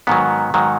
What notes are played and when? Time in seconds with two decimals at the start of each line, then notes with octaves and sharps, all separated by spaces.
0.07 G#2 D#3 F#3 B3
0.54 G#2 D#3 F#3